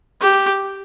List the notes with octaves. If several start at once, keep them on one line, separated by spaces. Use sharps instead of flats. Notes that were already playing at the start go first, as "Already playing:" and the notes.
G4